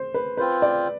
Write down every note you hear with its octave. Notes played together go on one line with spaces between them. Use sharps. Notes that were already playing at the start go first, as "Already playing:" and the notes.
Already playing: C5
B4
C4 F4 B4 C5
D5